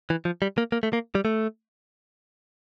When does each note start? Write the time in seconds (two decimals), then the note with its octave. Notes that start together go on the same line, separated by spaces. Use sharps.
0.10 E3
0.25 F3
0.42 G3
0.58 A#3
0.72 A#3
0.83 A3
0.93 A#3
1.15 G3
1.25 A3